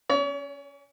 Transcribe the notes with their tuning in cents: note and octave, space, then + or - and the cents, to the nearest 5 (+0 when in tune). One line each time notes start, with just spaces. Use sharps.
C#4 +0 C#5 +40